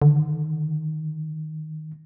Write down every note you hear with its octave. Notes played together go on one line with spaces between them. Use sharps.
D3 D#3